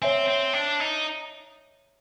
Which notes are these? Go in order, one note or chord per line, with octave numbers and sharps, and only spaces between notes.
C4 C#5 E5 G#5
C4
D4
D#4